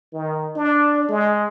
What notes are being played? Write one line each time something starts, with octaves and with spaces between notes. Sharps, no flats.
D#3
D4
G#3